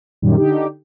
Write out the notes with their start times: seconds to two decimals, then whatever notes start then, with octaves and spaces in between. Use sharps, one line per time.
0.22 F#2 A#2 D#3 G3
0.37 D3 D#4 G4